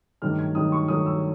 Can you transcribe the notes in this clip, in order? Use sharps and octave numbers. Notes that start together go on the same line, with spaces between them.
G2 D#3 F#3 A3 F6
G#6
G2 D#3 F#3 A3 D#6
C#6
G2 D#3 F#3 A3 D#6
E6